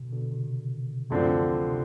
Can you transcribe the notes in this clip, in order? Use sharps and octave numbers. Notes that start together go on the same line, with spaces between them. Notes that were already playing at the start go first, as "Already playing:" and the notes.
Already playing: B2 D3
B2 D3
C3 D#3
D2 D3 F3 C4
C3 D#3